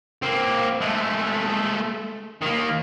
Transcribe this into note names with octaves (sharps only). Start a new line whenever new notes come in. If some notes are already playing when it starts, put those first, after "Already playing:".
A#3 C4
G#3 A3
D#3 A#3